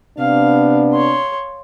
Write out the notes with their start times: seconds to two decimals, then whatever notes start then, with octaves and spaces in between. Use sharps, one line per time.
0.19 C3 B3 D4 F5
0.93 C#5 C6